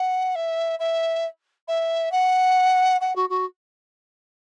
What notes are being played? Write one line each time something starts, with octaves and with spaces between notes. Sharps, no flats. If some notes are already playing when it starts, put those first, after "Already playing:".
Already playing: F#5
E5
E5
E5
F#5
F#5
F#4
F#4